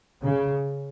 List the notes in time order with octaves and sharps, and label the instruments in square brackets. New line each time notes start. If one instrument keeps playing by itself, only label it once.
[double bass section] C#3